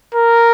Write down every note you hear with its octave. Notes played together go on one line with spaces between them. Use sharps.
A#4